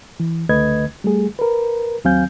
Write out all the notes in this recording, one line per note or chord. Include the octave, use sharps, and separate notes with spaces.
E3
C#2 D3 A3 B4 D#5 G#6
G3 A3 G#4
A#4 B4
D#2 F#3 C4 F5 G#5 G6